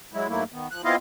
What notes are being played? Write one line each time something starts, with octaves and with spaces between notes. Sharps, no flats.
F#3 G#3 E4
G#2 F#3 A3 A#3 E4
D#3 B3
F3 F#6
B3 C4 E4 F4 D#5 F5